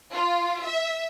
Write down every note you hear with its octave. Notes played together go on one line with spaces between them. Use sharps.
F4
E5